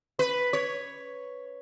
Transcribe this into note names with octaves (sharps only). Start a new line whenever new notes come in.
B4
C#5